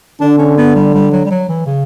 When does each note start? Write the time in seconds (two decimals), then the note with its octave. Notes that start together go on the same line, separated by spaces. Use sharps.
0.21 D3 D4
0.38 C#4
0.57 B3
0.75 G3
0.94 G3
1.12 F#3
1.26 G3
1.31 F#3
1.49 E3
1.66 C#3